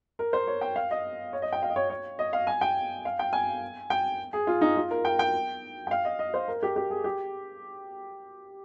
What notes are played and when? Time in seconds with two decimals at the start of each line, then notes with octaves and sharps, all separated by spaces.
0.19 A#4
0.33 C5
0.47 C#5
0.61 G5
0.76 F5
0.91 D#5
1.33 C#5
1.42 D#5
1.52 G5
1.62 F5
1.70 D#5
1.76 C#5
1.90 C#5
2.19 D#5
2.33 F5
2.47 G#5
2.61 G5
3.05 F5
3.19 G5
3.33 G#5
3.90 G5
4.33 G#4
4.47 F4
4.61 D#4
4.77 F4
4.91 A#4
5.05 G5
5.19 G5
5.87 G5
5.91 F5
6.05 D#5
6.19 D#5
6.34 C5
6.48 A#4
6.63 G4
6.76 G4
6.90 G#4
7.04 G4